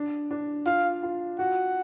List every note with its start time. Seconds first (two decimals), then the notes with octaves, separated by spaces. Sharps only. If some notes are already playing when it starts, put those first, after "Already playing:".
Already playing: D4
0.31 D4
0.66 F4 F5
1.03 F4
1.39 F#4 F#5